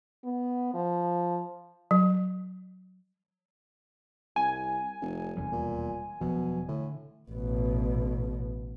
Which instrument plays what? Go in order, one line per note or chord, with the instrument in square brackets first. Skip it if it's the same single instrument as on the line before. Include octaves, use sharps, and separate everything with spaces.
[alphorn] B3
F3
[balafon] F#3
[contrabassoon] C2 [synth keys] G#5
[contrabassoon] F1
[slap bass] E1 D#2 G3
[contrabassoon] A#2
[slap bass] E1 F3 F#3 [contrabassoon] B2
[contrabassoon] A2 [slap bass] D3
[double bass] A1 B2